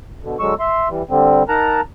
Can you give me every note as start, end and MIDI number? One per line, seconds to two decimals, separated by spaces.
0.23 0.37 47
0.23 0.37 50
0.39 0.54 50
0.39 0.54 54
0.39 0.54 56
0.39 0.54 85
0.39 0.54 88
0.59 0.88 76
0.59 0.88 84
0.89 1.03 52
0.89 1.03 55
1.10 1.43 50
1.10 1.43 55
1.10 1.43 60
1.48 1.81 63
1.48 1.81 70
1.48 1.81 78
1.48 1.81 81
1.48 1.81 82